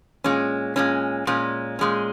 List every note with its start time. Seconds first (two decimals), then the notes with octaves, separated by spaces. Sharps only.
0.24 A#2 G#3 C#4
0.76 A#2 G#3 C#4
1.27 A#2 G#3 C#4
1.79 A#2 G#3 C#4